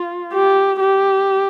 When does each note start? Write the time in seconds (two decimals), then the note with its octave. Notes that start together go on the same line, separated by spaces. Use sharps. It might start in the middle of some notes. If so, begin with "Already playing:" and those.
Already playing: F4
0.33 G4
0.80 G4